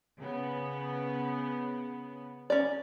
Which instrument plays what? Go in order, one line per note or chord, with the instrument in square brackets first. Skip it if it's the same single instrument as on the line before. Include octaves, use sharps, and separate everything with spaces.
[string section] C#3 B3
[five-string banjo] C#4 D5